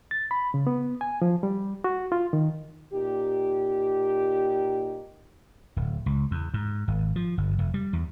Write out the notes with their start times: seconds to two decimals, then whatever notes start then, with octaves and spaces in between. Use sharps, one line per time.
0.11 A6
0.31 B5
0.54 C#3
0.67 B3
1.01 G#5
1.22 F3
1.43 G3
1.84 F#4
2.12 F4
2.33 D#3
2.93 A#2 D#4 G4
5.76 D1
6.06 C#2
6.31 E2
6.54 G#2
6.88 G#1
7.16 F3
7.38 G1
7.59 F1
7.74 G3
7.93 E2